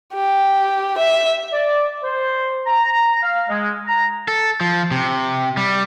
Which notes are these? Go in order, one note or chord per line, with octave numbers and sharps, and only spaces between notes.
G4
E5
D5
C5
A#5
F5
G#3
A#5
A4
F3
C3
G3